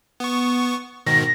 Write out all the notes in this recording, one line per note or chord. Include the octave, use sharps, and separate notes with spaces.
B3 C#6
G#2 B2 D#3 A#6